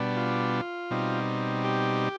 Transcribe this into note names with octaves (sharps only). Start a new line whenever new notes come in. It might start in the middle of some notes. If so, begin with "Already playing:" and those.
Already playing: B2 G3 B3 D4
F4
B2 G3 C4 D#4
G4